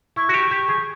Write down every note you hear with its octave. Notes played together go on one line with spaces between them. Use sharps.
E4 C#6
F#4
G4
G4
G#4